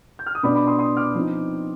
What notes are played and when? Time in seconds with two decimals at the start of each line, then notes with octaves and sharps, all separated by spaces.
0.19 G6
0.26 F6
0.35 D#6
0.43 B2 B3 D4 B5 D6
0.55 B5 D6
0.67 C6 D#6
0.79 C6 D#6
0.97 D6 F6
1.15 F3 C4 D#4